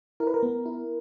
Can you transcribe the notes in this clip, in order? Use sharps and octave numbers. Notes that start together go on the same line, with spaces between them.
E4 A#4
B4
A#4
B3
E4